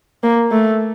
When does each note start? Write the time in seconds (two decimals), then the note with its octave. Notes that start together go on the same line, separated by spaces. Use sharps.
0.24 A#3
0.52 A3